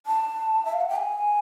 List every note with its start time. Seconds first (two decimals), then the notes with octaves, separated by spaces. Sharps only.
0.06 A5
0.65 E5
0.73 F5
0.81 F#5
0.89 G5
0.96 G#5